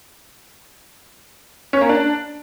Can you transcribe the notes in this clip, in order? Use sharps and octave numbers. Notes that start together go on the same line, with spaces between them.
C#4
A#3
D4